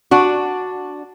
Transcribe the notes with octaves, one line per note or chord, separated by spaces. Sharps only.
D4 F#4